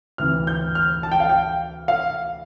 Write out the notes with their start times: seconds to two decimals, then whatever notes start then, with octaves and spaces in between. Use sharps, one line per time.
0.18 D2 C3 E3 F6
0.47 G6
0.75 F6
1.03 A5
1.12 G5
1.20 F5
1.29 G5
1.88 F5